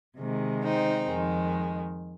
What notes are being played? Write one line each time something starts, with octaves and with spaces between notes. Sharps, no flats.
C3 D#3 G#3
C4 D#4
F2 D#3 G#3